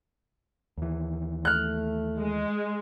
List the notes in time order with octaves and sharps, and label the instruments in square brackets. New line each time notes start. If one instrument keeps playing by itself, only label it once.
[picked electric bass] D#2 E3
[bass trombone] A3 [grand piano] F6 F#6
[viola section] G#3